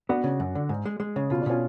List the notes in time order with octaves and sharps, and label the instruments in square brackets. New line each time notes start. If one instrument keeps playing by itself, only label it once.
[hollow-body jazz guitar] B3 [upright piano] D4 F#4
[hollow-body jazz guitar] C#3
F#2
D3
G#2
G#3
G#3
C#3
[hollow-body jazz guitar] B2 [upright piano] F4
[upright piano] D4
[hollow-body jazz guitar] B2 [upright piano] C#4 F4